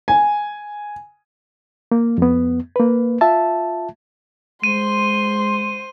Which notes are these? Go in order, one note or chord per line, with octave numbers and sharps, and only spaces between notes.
G#5
A#3
F2 B3
A#3 B4
F4 E5 A5
G#3 C5 C6 D#7